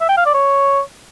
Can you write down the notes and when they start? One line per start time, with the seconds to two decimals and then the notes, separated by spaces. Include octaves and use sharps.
0.01 E5
0.09 G5
0.17 F5
0.26 D5
0.34 C#5